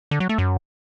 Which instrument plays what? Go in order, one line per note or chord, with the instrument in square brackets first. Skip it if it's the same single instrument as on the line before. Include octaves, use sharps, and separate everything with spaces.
[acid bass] D3
F#3
A3
F#2